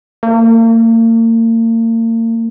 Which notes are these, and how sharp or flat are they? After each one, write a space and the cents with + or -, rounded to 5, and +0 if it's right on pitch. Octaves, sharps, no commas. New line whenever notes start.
A#3 -40